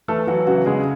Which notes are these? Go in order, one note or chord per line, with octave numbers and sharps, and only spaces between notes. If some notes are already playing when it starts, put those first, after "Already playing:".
E3 A3 A4
E3 F#3 F#4
C#3 F#3 F#4
C#3 G#3 G#4